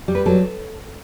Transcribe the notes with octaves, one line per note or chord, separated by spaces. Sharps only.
G3
B4
F#3 A4